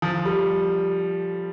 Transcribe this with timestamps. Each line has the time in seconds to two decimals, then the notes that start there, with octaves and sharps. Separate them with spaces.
0.02 F3
0.25 G3